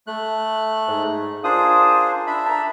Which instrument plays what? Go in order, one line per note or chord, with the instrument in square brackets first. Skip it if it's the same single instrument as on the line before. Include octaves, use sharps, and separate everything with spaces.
[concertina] A3 F#6
[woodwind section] G#2
[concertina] D4 G#4 C5 [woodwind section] F4 A#4 D#6
[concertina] D4 E5 B5
[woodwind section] A5 A#5